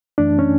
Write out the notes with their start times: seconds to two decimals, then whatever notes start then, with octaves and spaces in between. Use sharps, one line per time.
0.18 F#2 E3 A3 D4
0.39 C#4